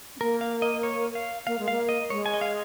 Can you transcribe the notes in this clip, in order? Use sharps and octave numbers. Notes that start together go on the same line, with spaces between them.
C#4
A#3 A#4
F5
D#5
C#5
F5
A#3 F5
G#3
A#3 F5
D#5
G#3 C#5
G#5
D#5
F5